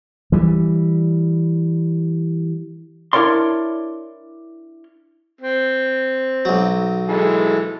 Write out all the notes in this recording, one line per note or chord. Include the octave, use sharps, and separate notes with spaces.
E3 G3
D4 E4 A#4 C#5 D5 C6
C4
B1 F#3
E3 G#3 A4